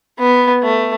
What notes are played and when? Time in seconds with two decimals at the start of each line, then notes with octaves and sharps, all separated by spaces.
0.19 B3
0.63 A3